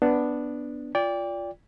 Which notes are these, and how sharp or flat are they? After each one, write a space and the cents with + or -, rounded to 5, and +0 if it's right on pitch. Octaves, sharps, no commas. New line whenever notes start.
B3 +0 D4 +0
F4 -5 D5 -20 G5 +25